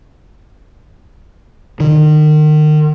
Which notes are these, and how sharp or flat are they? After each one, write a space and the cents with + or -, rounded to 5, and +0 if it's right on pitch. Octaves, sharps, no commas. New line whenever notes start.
D#3 -35